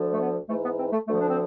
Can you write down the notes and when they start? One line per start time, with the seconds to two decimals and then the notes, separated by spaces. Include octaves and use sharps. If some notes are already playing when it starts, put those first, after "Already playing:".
Already playing: D2 D3 F3
0.13 A3
0.20 B3
0.49 G#2 E3 A3
0.64 B3
0.79 C4
0.93 A3
1.07 D2 D3 F3 A3
1.20 D4
1.28 C4